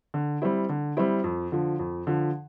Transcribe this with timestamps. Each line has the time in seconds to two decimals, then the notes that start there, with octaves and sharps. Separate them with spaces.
0.14 D3
0.42 G3 C4 E4
0.69 D3
0.97 G3 C4 E4
1.24 F2
1.52 D3 F3
1.79 F2
2.07 D3 F3